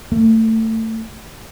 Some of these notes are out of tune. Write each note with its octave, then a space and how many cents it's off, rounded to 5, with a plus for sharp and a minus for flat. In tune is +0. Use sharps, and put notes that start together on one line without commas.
A3 +25